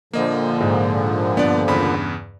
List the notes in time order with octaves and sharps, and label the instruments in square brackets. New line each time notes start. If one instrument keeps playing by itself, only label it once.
[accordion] A#2 D3 F3 [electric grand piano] A#3 D#5
[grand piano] G#2
[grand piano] G2 [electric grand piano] B3 D5
[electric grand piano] E2 C#3 B5